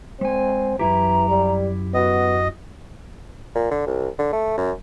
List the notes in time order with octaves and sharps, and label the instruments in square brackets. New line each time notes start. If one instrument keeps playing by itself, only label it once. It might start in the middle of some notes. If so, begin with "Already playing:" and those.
[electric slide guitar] G#3 G#5 [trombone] C4
[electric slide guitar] F#2 E4 G4 [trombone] E3 [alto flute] A#5
[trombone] G3
[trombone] B3 [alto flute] F#4 [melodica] D#5
[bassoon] A#2
D3
C2
D3
A3
F#2